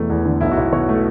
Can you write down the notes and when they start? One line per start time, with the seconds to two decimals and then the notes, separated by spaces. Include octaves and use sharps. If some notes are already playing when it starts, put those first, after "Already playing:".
Already playing: E1 E3 A3
0.10 E2
0.25 D3
0.41 B1 E4
0.52 F#4
0.57 B1
0.73 B2 C#5
0.89 A3